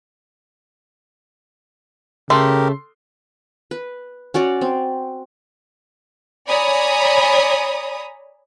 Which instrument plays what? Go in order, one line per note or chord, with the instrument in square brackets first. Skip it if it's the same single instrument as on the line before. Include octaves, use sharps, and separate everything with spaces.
[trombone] C#3 [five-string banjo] A3 [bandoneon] G4 A#4 [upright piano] C6
[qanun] B4
C#4 F#4 D5
C4
[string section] C#5 D5 G#5 A#5 B5 D#6